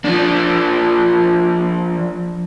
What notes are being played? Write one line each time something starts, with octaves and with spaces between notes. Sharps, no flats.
F3 D4